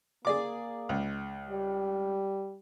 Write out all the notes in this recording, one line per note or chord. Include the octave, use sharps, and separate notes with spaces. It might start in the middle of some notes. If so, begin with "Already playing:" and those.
A#3 G#4 D5 D6
C#2
G3